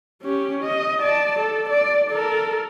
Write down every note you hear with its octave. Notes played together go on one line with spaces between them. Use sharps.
C#4 G4
D#5
D5 A5
A4
D5
A4 A#4